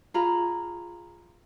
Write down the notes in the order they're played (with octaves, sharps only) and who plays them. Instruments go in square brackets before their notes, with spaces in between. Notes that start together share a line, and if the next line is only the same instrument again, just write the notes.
[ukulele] F4 G#4 A#5 B5